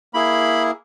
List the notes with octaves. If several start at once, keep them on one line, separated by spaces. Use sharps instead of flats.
A#3 E4 G#4 B5